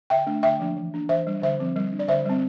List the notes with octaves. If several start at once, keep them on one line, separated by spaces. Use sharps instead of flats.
D3 E5 G5
A3 D4
D3 E5 G5
F3 A#3 D4
E3
A#3 D4
E3 C5 E5
G3 D4
D3 C5 E5
F3 C4
G3
D4
D5
D3 C5 E5
G3 C4